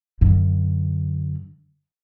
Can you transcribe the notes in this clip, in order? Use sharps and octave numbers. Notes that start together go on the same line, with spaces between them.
F#2 D3